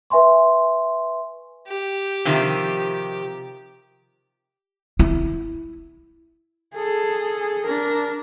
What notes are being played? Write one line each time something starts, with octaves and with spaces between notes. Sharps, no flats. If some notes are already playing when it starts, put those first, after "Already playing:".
B4 E5 G#5 C6 C#6
G4
C3 D#3 F3
E4
G#4 A4
D4 A#4